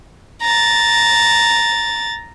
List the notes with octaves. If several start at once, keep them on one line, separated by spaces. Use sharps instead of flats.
A#5 A6